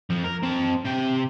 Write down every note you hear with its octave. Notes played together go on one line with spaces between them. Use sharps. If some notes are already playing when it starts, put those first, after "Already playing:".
F2 F3
A#4
C4 A5
C3 G5